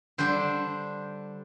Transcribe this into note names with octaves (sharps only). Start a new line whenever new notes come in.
D3 G3 D4 C5